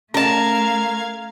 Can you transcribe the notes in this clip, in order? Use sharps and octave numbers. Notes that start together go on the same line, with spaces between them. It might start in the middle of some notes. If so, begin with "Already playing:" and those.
A3 C#4 A#4 F5 A5 G#6